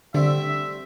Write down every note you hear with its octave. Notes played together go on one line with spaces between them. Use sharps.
D3 G3 A3 C4 E5